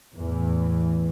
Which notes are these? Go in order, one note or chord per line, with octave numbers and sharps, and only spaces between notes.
E2 A2 E3